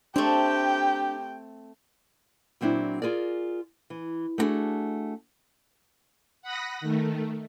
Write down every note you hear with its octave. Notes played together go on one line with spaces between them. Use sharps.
A3 C4 D4 G4 G5
A#2 F#3 C4 D4 E4
F4 G#4 A#4 D5
E3
A3 B3 D4 F#4 G#4
F#5 B5 D#6 F#6 A#6
D#3 A3